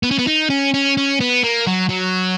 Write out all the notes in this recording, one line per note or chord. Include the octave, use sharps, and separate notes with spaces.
B3
C#4
B3
D#4
C#4
C#4
C#4
B3
A#3
F#3
F#3